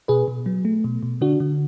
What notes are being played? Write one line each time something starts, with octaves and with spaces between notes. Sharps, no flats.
B2 G#4 B4
B2
F#3
A3
B2
B2
D3 D4 F#4
D3